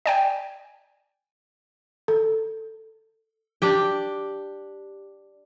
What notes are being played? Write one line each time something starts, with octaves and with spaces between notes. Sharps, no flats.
D5 G5 G#5
A4
D4 G4 G5